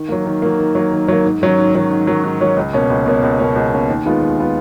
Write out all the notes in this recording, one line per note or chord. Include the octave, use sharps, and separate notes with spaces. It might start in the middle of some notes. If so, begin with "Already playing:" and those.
Already playing: D#3
F#3 A#3
D#3
F#3 A#3
D#3
F#3 A#3
D#3
F#3 A#3
G#2
D#3 F#3 C#4
G#2
D#3 F#3 C#4
G#2
D#3 F#3 C#4
G#2
D#3 F#3 C#4
C#2
B2 A#3 C#4
C#2
B2 A#3 C#4
C#2
B2 A#3 C#4
C#2
B2 A#3 C#4
D#2
D#3 G#3 B3 F4
D#2
D#3 G#3 B3 F4